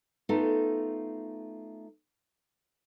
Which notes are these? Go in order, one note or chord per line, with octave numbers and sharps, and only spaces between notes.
A3 B3 D#4 F4 A4